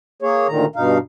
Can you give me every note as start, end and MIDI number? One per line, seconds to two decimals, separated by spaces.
0.22 0.47 58
0.22 0.47 68
0.22 0.47 73
0.48 0.65 38
0.48 0.65 46
0.48 0.65 51
0.48 0.65 82
0.76 0.98 43
0.76 0.98 47
0.76 0.98 63
0.76 0.98 77